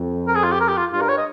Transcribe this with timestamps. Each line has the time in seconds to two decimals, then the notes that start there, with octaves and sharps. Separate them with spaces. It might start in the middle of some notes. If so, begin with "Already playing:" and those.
Already playing: F2
0.28 A#4
0.35 G#4
0.44 F4
0.52 G4
0.60 A#4
0.68 G4
0.77 F4
0.93 G2 F4
1.01 A#4
1.09 C#5
1.17 D#5